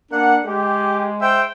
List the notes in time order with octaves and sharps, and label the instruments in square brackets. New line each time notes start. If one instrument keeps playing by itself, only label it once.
[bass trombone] A#3 [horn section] D4 F#5
[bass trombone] G#3 [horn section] G4
[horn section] C5 E5 G5